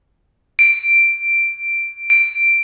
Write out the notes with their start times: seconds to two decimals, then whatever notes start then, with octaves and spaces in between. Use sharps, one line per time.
0.59 D7
2.10 D7